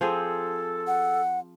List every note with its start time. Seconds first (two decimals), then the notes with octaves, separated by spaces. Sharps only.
0.01 F3 C4 G#4 A4
0.87 F#5